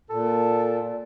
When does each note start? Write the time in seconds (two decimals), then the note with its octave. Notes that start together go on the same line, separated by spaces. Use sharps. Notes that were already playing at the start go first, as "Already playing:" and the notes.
0.10 A#2 A4